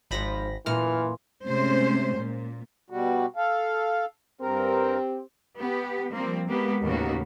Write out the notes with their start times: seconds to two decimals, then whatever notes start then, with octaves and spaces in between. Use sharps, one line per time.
0.11 G#1 G#2 F3 B5 A#6
0.66 F#2 A#2 E3 A#4 F6
1.45 C3 G#3 A3 C#4 C5
2.18 A#2
2.90 B2 G3 F#4
3.36 A4 F5
4.41 G2 C4 G4 A#4
5.56 B3 G4
6.13 F3 G3 A#3 C4
6.48 G#3 A#3 B3 G4
6.84 D#2 A2 C#3 A#3 B3 F#4